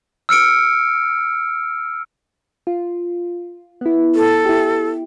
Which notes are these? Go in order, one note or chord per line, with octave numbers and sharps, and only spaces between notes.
E6 F6 C#7 D7
F4
B3 E4
A4
E4 G4